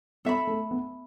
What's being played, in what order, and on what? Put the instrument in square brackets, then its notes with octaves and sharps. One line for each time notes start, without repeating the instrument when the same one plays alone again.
[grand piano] B3 [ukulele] A4 E5 B5
[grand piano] A3
B3